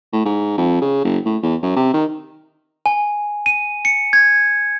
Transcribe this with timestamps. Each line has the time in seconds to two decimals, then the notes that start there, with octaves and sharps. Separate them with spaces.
0.13 A2
0.25 G#2
0.58 F2
0.81 C#3
1.05 F#1
1.26 A2
1.43 E2
1.63 F#2
1.76 C3
1.94 D#3
2.86 G#5
3.46 D#7
3.85 C#7
4.13 G#6